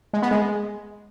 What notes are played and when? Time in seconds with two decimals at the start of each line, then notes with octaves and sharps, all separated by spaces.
0.13 G#3
0.22 B3
0.31 G#3